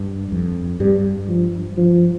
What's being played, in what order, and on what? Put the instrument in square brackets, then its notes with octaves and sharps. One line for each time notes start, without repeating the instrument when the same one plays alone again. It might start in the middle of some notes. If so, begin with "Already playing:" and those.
Already playing: [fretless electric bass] G2
F2
[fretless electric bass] G2 [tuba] G3
[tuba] F3
F3